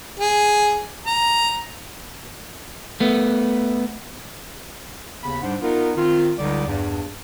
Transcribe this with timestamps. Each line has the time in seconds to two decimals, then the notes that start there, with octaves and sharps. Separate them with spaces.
0.20 G#4
1.06 A#5
3.00 A3 B3
5.22 D#2 C#3 B3 B5
5.41 G#2 G3 D4 C5 F#5
5.62 B3 D#4 F4 A#4
5.96 D#3 C4 F4
6.38 C#2 D3 G3 D#4 D5
6.67 E2 G2